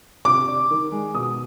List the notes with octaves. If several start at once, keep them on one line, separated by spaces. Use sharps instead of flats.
C3 D6
D4
D#3
G#3
B2 D#6